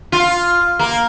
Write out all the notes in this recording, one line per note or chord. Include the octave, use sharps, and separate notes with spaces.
F4
A#3